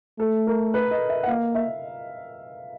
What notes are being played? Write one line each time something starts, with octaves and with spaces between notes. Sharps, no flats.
A3 A4
A#4
B4
D#5
E5
F#5
A#3 F5
E5